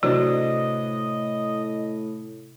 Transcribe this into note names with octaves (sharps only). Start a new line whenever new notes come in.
A2 C3 F#3 D4 D#5